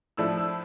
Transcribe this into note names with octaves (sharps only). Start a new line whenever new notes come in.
A2 F3 A3 D4 E6
E6